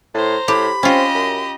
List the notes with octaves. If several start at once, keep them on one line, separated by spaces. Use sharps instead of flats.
A2 C5 A#5
A2 G4 B5
C4 C#4 F4 G4 D#5
F#2